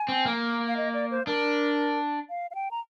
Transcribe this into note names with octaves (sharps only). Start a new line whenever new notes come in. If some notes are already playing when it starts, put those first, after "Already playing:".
Already playing: G#5
C4
A#3
F5
D#5
D5
C5
D4 A#4
F5
F5
G5
A#5